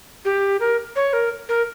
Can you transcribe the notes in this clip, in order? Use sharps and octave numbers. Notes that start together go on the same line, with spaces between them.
G4
A#4
C#5
A#4
A#4